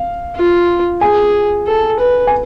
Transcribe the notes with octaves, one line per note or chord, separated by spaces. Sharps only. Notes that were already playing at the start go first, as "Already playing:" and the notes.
Already playing: F5
F4
G#4 G#5
A4
B4
G#5